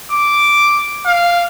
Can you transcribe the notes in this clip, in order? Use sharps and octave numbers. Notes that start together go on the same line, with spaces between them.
D6
F5